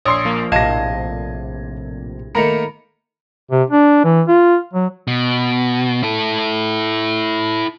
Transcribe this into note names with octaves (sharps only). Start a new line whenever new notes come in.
A#1 C#5 C6 D#6 E6 C7
F3 A#3
A#1 A2 C3 D#5 F5 A5 G#6 A#6
D#3 A3 A#3 A#5 B5 A#6 C#7
C3
D4
E3
F4
F#3
B2
E4 A4